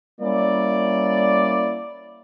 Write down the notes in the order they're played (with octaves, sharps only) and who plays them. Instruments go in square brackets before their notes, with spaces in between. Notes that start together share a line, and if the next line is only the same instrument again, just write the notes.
[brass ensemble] G3 A#3 C#4 E4 D5